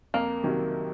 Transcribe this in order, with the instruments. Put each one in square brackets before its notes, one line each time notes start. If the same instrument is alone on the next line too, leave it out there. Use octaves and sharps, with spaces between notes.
[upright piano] F2 [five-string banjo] A#3
[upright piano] C3 D#3 F#3